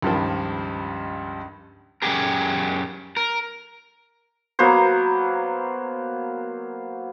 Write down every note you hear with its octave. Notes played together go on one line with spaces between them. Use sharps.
C#2 G2 D#3 F3
F#2 E3 C#4 G4 G#4 A#4
A#4
F#3 A#3 B3 C5